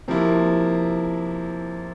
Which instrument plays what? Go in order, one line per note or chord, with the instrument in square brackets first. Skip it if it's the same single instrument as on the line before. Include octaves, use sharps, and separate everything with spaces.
[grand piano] C3 F3 A#3 E4